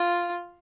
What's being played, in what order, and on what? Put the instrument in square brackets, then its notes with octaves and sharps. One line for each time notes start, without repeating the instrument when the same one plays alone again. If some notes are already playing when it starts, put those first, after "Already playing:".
Already playing: [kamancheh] F4